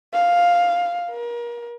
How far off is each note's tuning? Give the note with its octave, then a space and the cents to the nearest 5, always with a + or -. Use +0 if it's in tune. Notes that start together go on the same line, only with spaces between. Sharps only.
F5 +5
A#4 +35